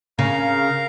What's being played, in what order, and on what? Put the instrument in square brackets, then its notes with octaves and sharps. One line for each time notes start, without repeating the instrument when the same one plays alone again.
[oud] C#3 [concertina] A#4 F5 A#5